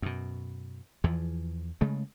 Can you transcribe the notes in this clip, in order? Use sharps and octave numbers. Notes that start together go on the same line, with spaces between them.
F#2 B2
E2 E3 F3
C#3 G#3 A3